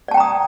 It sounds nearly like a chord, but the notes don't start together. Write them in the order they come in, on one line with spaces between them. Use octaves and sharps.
D5 A5 G5 A#5 D#6